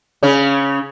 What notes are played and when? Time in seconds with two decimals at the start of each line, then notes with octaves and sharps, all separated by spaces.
0.23 C#3 C#4